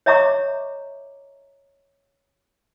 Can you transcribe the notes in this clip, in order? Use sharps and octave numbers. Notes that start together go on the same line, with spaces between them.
C#5 D#5 E5 A#5 C#6 D6